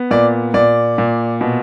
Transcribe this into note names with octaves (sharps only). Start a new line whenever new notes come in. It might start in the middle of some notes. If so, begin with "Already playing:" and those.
Already playing: B3
A#2 D5
A#2 D5
A#2
B2